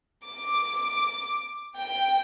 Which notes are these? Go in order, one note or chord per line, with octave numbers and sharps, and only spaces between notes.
D6
G5